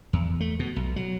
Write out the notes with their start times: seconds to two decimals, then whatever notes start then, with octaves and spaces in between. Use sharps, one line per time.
0.13 E2
0.40 A3
0.59 B2
0.76 B1
0.96 F#3